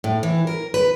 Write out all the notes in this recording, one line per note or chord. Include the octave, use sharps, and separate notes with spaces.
A2
E3
A#4
B4